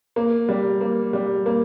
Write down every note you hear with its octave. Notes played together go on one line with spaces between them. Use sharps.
A#3
G3
A#3
G3
A#3